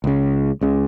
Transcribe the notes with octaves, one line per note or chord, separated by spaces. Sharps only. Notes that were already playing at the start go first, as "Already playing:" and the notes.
C#2 C#3
C#2 C#3